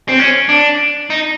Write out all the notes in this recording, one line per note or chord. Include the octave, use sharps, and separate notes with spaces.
C4
C#4
D4
D#4